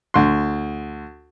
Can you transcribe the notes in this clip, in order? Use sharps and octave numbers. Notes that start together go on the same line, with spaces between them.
D2 C6